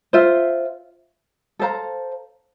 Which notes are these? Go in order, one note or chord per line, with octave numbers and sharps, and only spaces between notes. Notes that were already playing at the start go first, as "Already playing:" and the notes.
F4 C5 E5
A4 C5 F5 A#5